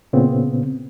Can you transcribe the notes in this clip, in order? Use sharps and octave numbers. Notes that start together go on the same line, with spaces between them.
A#2 C#3 B3 C4